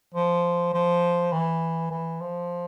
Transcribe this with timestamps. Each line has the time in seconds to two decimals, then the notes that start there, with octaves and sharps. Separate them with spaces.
0.15 F3
0.74 F3
1.33 E3
1.91 E3
2.21 F3